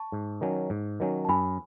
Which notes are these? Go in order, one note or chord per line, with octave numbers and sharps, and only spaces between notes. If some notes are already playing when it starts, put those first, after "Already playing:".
Already playing: A5 C#6
G#2
D#3 F#3 C#4
G#2
D#3 F#3 C#4
A5
F#2 G#5 B5